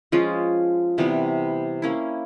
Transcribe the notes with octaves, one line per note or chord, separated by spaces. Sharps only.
F3 G#3 C#4 F4
C3 E3 G3 B3
A#3 C#4 E4